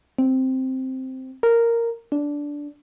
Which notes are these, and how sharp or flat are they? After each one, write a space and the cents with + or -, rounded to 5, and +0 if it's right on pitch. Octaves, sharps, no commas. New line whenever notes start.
C4 +0
A#4 -5
D4 -10